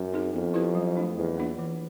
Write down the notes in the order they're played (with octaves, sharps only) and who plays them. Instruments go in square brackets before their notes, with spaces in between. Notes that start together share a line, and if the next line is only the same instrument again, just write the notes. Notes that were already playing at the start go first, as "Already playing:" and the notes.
Already playing: [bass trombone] F#2
[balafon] C4 D#4 G#4
[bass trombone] F2 [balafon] B3
[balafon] E4 G4 B4
F#3
A3 D4
[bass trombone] E2 [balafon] F#3
[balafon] A#3 D4 F4
E3